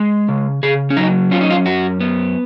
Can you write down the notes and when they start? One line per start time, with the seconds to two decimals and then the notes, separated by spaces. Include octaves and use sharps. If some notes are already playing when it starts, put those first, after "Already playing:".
Already playing: G#3
0.28 C#3
0.63 C#3 G#4
0.90 C#4
0.97 F#3 D#4
1.31 C#4 F4
1.41 D#4
1.50 F4
1.66 F#2 F#4
2.00 B3